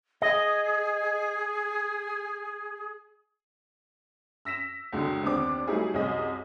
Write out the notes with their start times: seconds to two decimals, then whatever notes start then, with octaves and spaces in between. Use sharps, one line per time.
0.22 G#4 D#5
4.45 E6 A#6 B6 E7
4.92 C#2 B2 D3 G#3
5.23 D#2 B3 C4 D4 D6
5.67 F#3 G3 A3 D#4 E4 G#4
5.94 C2 F#2 G#4 D#5